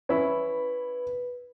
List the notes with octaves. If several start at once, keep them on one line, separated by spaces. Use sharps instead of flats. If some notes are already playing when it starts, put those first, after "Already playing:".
C#4 E4 B4